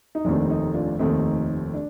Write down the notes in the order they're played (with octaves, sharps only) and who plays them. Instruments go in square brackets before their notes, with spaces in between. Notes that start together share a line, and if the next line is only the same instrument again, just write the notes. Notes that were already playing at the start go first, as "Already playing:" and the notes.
[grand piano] D#4
F1 D#2 D#3 A3 C4 D4
D#4
D4 F4
F1 D#2 D#3 A3 C4 D#4
D4